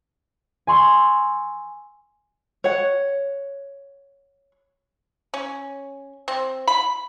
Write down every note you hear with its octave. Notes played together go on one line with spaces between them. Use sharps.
G#5 C6 C#6 E6
C#5 F#5
C#4
C4
B5